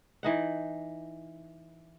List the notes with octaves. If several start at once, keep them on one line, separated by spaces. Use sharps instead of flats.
E3 D#4 F#5